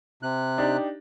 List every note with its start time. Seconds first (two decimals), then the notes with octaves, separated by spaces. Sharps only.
0.23 C3 F#6
0.58 D4 D#4 G4